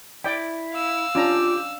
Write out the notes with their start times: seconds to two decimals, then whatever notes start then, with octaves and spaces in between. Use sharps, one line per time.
0.24 E4 D5 G5
0.73 F5 E6
1.15 C#4 D4 F4 G4 A#5